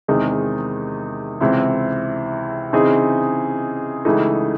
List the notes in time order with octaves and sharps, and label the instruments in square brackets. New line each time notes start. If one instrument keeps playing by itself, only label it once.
[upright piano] E2 C3 D#3 G#3 D#4
C#2 C3 E3 C4 E4
C#3 E3 C4 D#4 G#4
C#2 C#3 E3 A3 D#4